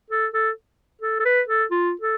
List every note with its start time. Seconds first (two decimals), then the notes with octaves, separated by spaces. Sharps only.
0.11 A4
0.34 A4
1.02 A4
1.19 A4
1.25 B4
1.48 A4
1.71 F4
2.01 A4